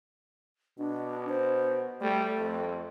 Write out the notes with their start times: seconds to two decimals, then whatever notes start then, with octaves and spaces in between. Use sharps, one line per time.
0.78 B2 D4
1.29 C5
2.01 G3 A3
2.38 F2